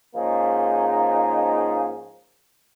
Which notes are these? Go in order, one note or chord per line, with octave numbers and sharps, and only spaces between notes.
G#2 F3 A#3 C#4 D#4 G#4